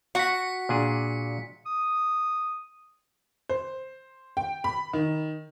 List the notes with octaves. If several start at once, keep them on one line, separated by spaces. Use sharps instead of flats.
F#4 F#5 B6 C#7
A#2 D4 G#4
D#6
C5
G5
B5
D#3